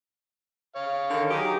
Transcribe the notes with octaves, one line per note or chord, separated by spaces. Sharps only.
C#5 F5
D3 D#3
F#3 D#4 G4 G#4 D#6